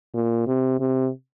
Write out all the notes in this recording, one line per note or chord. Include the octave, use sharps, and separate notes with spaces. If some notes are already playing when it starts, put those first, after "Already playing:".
A#2
C3
C3